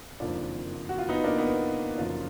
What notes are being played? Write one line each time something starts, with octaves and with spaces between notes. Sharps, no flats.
F#1 F2 D#3 D4 F4
F#4
F4
B3 D#4
A#3 D4
B3 D#4
F#1 F#2 D3 F3 D4 F4